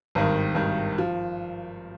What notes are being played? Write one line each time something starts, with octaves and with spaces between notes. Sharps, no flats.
G#1 G2 D#3
G#1 G2 D#3
F3